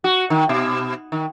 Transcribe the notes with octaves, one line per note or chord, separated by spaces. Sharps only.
F#4
D#3
B2
D#3